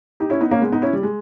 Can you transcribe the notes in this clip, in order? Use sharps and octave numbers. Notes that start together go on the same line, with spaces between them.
D#4 G4
C#4 E4
B3 D#4
A#3 C#4
G#3 B3
B3 D#4
C#4 E4
G3
G#3